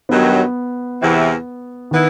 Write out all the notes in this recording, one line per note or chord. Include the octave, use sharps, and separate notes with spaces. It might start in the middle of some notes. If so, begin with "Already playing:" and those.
G2 D#3 F#3 B3
E2 C3 E3
D#3 E3 B3 E4